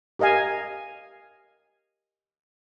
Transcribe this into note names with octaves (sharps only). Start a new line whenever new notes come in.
G4 A#4 D#5 F5 G#5